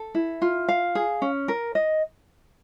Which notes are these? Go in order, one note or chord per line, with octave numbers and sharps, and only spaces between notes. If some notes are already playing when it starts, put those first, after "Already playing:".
Already playing: A4
E4
F4
F5
G#4
C#4
A#4
D#5